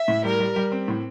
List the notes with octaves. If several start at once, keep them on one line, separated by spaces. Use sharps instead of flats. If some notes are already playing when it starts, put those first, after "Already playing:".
Already playing: E5
A2
G3 A#4
G3
G3
C4
A2